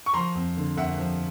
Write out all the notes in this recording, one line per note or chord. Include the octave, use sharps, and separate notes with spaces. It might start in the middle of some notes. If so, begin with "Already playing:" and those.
C#6
F3 A#5 C6
F2
D3
F2 E5 F#5
F3